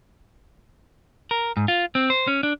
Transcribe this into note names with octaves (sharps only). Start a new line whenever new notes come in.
A#4
G#2
F4
C4
C5
C#4
D4